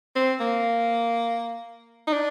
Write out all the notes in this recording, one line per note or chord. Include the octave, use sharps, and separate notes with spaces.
C4
A#3
D#4
D4